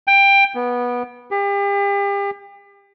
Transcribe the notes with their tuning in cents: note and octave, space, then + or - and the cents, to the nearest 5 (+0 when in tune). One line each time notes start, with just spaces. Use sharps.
G5 +15
B3 -15
G4 +40